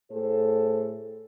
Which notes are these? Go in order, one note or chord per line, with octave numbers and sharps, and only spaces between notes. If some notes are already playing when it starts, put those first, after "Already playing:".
A2 A3 G#4 A4 C5